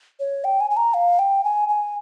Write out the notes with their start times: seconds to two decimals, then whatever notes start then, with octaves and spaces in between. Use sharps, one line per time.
0.20 C#5
0.44 G5
0.60 G#5
0.70 G#5
0.77 A#5
0.94 F5
1.19 G5
1.44 G#5
1.68 G#5